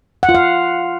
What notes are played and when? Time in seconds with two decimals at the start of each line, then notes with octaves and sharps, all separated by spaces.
0.23 F#5
0.29 F4
0.35 F5